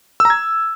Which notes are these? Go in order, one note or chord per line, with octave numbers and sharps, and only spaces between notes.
E6
A#5
G#6